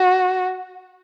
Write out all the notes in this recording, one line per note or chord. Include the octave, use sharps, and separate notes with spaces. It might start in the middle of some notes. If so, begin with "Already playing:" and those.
Already playing: F#4